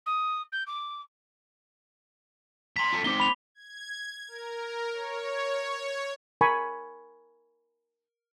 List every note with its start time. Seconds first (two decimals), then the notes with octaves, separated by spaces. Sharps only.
0.06 D#6
0.52 G6
0.67 D6
2.76 A#5 C6 B6
2.92 F4 A4
3.04 C4 D#4 D6 G7
3.20 B5 F7
3.55 G#6
4.28 A#4
4.92 C#5
6.41 A#4 G#5 B5 C#6